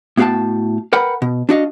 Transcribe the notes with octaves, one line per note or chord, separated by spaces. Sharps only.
A2 B3 F#4 F5 G5 A5
A#4 B4 F#5 G5 B5
B2
D4 F#4 D#5 F5